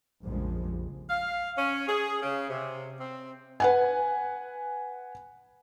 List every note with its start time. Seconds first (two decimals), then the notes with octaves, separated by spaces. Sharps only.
0.24 A#1 F2 C#3 F3 G3 G#3
1.10 F5
1.57 C#4
1.88 G#4
2.23 C#3
2.50 C3
3.01 C4
3.60 B4 F#5 G#5